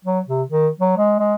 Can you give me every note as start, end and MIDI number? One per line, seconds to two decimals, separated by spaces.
0.05 0.20 54
0.27 0.42 48
0.49 0.67 51
0.79 0.93 54
0.97 1.16 56
1.19 1.34 56